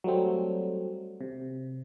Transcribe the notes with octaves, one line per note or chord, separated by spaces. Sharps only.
F#3 G3 A3 C4
C3